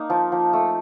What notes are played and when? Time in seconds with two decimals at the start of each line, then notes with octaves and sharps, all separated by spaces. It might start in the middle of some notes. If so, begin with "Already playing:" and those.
Already playing: A#3 D#4
0.10 F3
0.32 F3
0.53 A3